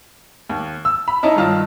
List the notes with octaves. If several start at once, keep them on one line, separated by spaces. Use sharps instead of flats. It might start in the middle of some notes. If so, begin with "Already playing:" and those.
D#2
E6
B5
C#4 D#4 E4 D#5 A5 A#5
G2 D#3 F4 D#5 A5